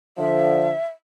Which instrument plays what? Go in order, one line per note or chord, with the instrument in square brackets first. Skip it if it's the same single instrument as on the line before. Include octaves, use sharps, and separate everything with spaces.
[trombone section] D3 F3 [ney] E5